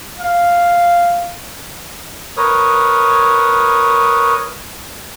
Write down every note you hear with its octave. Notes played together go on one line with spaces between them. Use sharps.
F5
A#4 B4 C#5 D#6